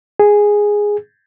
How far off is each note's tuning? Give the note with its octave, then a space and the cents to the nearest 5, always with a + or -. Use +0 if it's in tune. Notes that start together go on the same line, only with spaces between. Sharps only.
G#4 -5